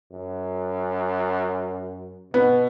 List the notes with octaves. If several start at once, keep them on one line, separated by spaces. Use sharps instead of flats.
F#2
B2 B3